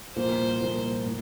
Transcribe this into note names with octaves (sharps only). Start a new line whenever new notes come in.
C2 A#2 F3 A#3 C5
C2 A#2 F3 A#3
A2